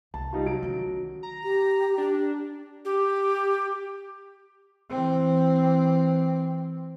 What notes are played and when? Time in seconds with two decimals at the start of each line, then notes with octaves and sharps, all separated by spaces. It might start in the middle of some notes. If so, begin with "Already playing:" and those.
0.14 C2 A5
0.33 G3 D#4 F4
0.45 F#3 D7
0.63 D#3 C#4
1.23 A#5
1.44 G4
1.98 D4
2.85 G4
4.90 E3 C4